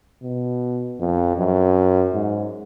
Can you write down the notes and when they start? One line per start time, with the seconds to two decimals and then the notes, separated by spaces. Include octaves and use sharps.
0.23 B2
0.99 F2
1.37 F#2
2.13 G#2